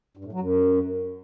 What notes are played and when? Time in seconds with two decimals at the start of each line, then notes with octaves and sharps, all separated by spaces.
0.17 G2
0.25 A2
0.32 F#3
0.40 F#2